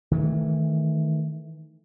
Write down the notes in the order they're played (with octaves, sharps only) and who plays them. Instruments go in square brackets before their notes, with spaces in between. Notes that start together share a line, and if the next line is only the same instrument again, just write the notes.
[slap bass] D#3 E3 A3